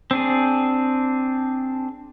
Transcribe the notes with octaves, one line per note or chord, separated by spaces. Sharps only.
C4 D4 G#4